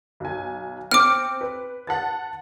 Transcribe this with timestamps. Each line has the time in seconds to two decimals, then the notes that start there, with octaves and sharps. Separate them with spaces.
0.20 B1 G#5
0.91 C4 D6 F6 C#7 D7
1.41 B4
1.87 F#5 A5 A6